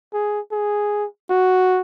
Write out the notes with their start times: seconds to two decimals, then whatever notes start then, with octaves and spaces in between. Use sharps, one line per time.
0.13 G#4
0.52 G#4
1.30 F#4